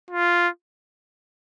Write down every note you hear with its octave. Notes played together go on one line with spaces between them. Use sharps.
F4